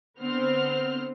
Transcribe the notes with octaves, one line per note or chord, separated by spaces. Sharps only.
D3 B3 C4 C5 F6